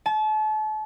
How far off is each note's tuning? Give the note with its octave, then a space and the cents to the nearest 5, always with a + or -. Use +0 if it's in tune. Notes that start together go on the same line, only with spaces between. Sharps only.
A5 -35